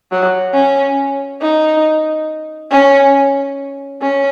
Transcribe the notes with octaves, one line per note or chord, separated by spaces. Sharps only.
F#3
C#4
D#4
C#4
C#4